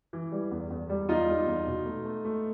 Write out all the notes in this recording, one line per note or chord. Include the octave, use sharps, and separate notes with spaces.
E3
G3
E2
E2
G3
E2 D#4 F4
G3
E2
B2
A3
A3
A3